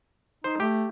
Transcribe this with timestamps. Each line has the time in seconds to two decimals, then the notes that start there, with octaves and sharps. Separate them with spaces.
0.44 D#4 C5
0.60 A3 G4